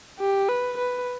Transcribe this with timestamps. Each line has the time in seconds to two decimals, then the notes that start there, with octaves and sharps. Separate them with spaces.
0.19 G4
0.49 B4
0.78 B4